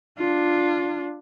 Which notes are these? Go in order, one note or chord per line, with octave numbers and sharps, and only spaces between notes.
D4 F4